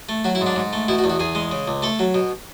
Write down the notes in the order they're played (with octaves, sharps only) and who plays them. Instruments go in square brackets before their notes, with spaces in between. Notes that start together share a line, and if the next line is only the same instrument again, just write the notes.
[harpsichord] A3
F#3 F#4
E4
G#2
D4
G#2
A3
B2 E4
F#4
E2
F#4
E2 G#4
G#3
C#3
C#2
A3 A4
F#3
B2